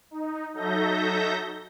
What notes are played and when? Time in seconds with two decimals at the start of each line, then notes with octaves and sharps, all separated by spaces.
0.11 D#4
0.54 F#3 D#4 A4 E5 G6 A#6